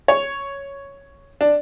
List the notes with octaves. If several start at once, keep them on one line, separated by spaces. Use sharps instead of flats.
C#5
D4